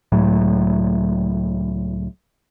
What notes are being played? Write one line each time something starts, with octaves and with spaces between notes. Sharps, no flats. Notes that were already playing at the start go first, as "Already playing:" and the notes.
C#2 A2 F#3